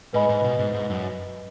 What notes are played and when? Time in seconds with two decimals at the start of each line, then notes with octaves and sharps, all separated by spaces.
0.13 G#2 B4 D#5 G#5 B5
0.29 G#2
0.44 B2
0.59 G#2
0.74 G#2
0.90 F#2